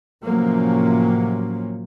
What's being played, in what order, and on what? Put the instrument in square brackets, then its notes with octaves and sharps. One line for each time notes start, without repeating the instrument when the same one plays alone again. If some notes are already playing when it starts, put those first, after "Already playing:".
[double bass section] A2 C3 F3 F#3 A#3 C#4